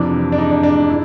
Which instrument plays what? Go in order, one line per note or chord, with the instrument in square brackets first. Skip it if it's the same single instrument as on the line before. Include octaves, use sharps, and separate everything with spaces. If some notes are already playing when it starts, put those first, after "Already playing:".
Already playing: [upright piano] F2 C3 E3 D4
D4
D#4
D4
D4
D#4
E4